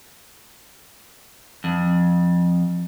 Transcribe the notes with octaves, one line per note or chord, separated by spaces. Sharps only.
F2